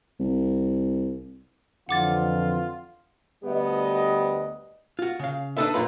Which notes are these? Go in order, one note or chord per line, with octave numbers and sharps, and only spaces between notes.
C2
F2 D3 E3 F4 F#5 D6 A6
D2 G3 B3 G4 D5 D#5
F4 F#4
C#3 F5
D4 D#4 A4 B4 E5
F#2 A#2 F4 B4 A#5